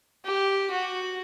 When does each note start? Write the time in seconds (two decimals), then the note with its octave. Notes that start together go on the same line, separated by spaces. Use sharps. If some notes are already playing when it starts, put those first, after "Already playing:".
0.25 G4
0.71 F#4